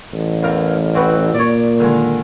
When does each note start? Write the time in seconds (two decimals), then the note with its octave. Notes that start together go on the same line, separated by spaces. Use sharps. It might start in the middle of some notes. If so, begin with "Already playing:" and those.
0.13 A1
0.43 E2 A#4 F5
0.95 C4 F#4 B4
1.34 A#2 C#5 D5
1.80 D3 D#3 G#3